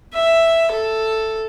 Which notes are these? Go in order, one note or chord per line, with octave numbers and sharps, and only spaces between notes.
E5
A4